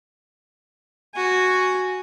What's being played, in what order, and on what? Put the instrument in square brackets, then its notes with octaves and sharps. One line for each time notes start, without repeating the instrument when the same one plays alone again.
[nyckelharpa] F#4 G#5